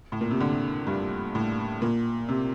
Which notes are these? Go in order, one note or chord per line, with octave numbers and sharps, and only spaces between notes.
A2
A#2
C3
D3
G2
A2
A#2
C3